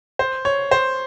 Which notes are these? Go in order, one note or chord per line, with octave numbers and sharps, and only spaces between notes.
C5
C#5
C5